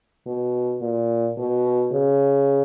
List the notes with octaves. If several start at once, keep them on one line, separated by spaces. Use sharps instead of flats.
B2
A#2
B2
C#3